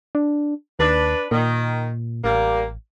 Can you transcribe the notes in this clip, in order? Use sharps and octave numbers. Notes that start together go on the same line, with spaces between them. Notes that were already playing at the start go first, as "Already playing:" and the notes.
D4
D#2 D4 B4
A#2 D#3
A1 G3 A#3